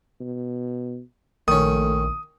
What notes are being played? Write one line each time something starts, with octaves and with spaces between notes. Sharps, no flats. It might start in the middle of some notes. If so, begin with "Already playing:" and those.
B2
A#1 D#3 A3 C#4 D#6